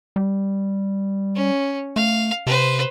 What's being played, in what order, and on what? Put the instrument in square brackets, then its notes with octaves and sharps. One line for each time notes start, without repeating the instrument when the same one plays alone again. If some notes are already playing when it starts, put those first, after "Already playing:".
[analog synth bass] G3
[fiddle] C#4
[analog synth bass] A3 [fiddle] F5
[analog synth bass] C3 [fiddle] B4 C5